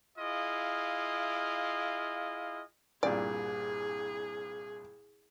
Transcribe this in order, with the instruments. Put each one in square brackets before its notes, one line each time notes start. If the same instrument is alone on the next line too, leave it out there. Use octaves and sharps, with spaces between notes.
[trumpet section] E4 F4 G#4 D#5 F5
[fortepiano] C2 G2 A#2 [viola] G#4 [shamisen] D5